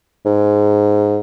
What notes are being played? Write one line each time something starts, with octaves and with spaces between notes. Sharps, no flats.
G#2